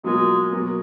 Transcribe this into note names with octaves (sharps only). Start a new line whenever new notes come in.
B2 F#3 G#3 A#3 F4 A#4
B2 F#3 A#3